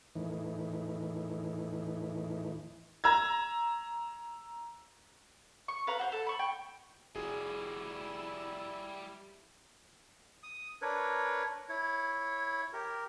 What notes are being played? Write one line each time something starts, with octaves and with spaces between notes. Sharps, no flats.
E2 A2 D#3 E3
A#5 E6 G#6
C#6
B4 F5 A#5
F#4 C5
A4
B5 C#6
G5
F1 G3 E4 F#4 G#4
D#6
D4 A#4 B4 C#5
E4 C#5
G4 A#4